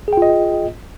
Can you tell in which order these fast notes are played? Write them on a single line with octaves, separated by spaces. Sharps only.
G#4 G5 F4 D#5